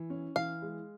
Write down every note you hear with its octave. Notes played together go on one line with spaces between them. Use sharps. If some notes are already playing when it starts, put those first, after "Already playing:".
Already playing: E3
C#4
E3 F5
G#3